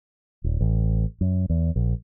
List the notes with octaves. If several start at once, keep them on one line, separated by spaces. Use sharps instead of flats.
D#1
A1
F#2
E2
A#1